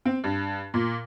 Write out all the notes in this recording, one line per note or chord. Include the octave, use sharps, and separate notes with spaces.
C4
G2
A#2